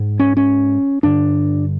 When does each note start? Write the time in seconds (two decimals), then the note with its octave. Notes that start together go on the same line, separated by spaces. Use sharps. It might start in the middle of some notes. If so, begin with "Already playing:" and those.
Already playing: G#2
0.19 C#4
0.37 C#4
1.03 G2 D3 D4